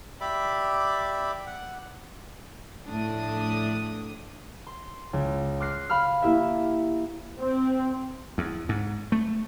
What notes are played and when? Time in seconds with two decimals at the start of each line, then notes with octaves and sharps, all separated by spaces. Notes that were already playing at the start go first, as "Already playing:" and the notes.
0.21 G4 D5 E5 B5 D6
1.46 F#5
2.88 A2 F3 A3 D4 D#6
4.67 C6
5.13 C#2
5.60 C6 D6 F6 F#6 A#6 C7
5.90 F5 B5 D6 F6
6.22 A#3 E4 G4 E5
7.39 C4
8.38 E2
8.69 G#2
9.12 A3